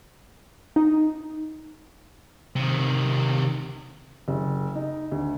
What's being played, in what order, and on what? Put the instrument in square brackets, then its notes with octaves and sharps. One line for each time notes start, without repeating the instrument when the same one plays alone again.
[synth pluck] D#4
[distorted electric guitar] C3 D#3
[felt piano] F#1
D#4
D2